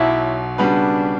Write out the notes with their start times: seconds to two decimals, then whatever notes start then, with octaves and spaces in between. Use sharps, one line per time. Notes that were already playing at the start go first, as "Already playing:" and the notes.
Already playing: B1 B2 F#3 E4
0.58 C#3 G3 B3 D4 F#4 B4